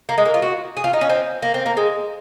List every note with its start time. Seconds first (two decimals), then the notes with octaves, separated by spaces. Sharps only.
0.09 A#3
0.18 G#3
0.25 A#3
0.34 F4
0.42 F#4
0.77 G#4
0.84 F4
0.93 D#4
1.01 C#4
1.10 C4
1.42 A#3
1.54 C4
1.66 A#3
1.77 G#3